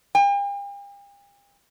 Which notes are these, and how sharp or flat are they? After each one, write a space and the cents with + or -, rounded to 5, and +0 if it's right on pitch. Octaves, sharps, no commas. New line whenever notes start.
G5 +45